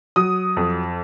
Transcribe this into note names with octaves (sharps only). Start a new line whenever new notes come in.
F#3 D#6
F2